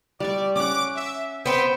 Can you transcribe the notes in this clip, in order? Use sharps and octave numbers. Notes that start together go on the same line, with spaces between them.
G3 D5 C#6
C#4 F#5 D6
E5
B3 C4 G5